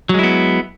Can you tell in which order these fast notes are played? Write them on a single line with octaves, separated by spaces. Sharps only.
F#3 G#3 E4 B3